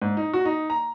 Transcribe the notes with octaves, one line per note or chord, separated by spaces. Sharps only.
G#2
D#4
F#4
D#4
A#5